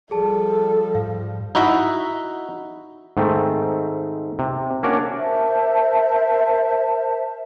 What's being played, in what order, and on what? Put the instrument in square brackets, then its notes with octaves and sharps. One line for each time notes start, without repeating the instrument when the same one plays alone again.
[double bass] F3 G3 [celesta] G#4 A5 [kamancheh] A4
[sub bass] G#2 [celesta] F5
[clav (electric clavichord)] D#4 E4 F#4 D#5 E5
G#2 D#3 A3 C4
C3
A#3 C#4 D4 F#4 A#4 D5
[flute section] A#4 C5 E5 A5